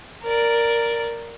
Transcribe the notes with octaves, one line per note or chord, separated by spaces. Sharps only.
A#4 D5